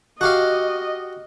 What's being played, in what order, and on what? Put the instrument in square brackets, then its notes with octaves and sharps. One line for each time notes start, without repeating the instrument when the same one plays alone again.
[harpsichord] F#4 G4 F5 [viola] D#5